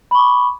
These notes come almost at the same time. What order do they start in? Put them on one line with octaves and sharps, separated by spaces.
B5 C#6 D6